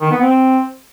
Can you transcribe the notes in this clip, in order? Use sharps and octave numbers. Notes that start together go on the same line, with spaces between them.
D#3
B3
C4